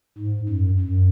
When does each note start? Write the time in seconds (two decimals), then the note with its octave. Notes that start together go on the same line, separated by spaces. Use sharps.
0.18 G#2
0.49 F#2
0.80 F#2